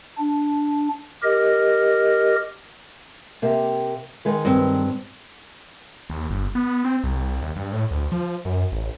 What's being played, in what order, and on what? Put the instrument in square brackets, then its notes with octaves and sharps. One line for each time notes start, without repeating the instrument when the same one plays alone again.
[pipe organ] D4
G4 A#4 D#5
[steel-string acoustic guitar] C3 A#3 G4
D#3 G#3 B4
[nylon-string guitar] G2 C4
[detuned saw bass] D#2
G1
B3
C4
C2
D#2
G2
A2
D2
F3
F#2
A1